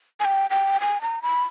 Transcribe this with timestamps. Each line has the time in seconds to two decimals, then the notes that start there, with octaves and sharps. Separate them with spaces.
0.20 G#5
0.25 G5
0.50 G5
0.81 G#5
1.01 A#5
1.22 B5